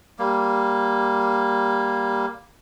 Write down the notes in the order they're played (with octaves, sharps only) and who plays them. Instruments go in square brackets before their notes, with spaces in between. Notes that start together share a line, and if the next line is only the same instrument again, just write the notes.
[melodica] G3 A#3